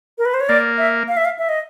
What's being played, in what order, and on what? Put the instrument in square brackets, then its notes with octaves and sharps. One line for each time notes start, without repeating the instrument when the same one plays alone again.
[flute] A#4
B4
C5
C#5
[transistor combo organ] A#3 [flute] D5
[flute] E5
F5
E5
F5
E5
D#5